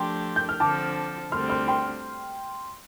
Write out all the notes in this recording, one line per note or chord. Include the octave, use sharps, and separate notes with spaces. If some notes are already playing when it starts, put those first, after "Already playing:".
Already playing: F3 A3 D4 G4 G5 C6
G6
F6
D3 F3 C4 A4 A5 D6
D2 D3 G3 C4 C6 F6
C6 F6
G5 C6